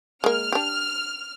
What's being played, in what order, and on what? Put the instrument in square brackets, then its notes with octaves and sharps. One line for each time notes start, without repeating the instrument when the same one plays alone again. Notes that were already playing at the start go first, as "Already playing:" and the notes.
[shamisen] G#3 A#3 [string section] F6
[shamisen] D4 G4